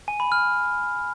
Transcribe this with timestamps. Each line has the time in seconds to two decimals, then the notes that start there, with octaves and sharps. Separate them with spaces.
0.08 G#5
0.20 B5
0.32 F6